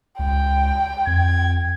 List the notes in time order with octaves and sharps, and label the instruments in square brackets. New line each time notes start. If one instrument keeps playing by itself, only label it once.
[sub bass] C#2 [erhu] G5
[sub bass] F2 [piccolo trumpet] G#6